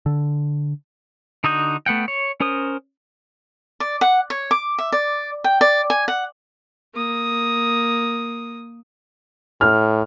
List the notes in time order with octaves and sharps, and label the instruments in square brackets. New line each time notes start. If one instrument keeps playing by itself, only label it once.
[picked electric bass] D3
[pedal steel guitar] D3 D#4 F#4 D#6 G6
A3 B3 F#5 G5
C#5
C#4 A#4 C5 D#6
[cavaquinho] D5
F#5
C#5
D6
E5
D5
G5
D5
G#5
F#5
[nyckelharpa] A#3 D#6
[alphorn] A2 [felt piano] F6